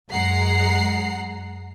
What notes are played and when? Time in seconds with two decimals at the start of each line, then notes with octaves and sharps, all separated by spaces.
0.11 F#2 G#3 F#5 A#5 C7